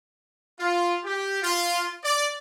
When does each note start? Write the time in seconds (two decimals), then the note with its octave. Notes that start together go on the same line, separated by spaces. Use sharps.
0.59 F4
1.04 G4
1.42 F4
2.04 D5